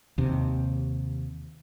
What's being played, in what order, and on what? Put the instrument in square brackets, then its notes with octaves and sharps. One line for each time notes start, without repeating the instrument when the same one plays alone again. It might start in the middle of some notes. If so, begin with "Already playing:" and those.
[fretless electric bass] D#2 C3